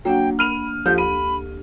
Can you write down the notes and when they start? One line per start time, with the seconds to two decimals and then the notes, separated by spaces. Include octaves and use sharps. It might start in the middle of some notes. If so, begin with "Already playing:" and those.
0.05 F#3 A#3 D4 F#5 G5
0.39 B5 F6 D#7 F7
0.86 D2 F3 G4 A4 G6
0.98 B5 D#7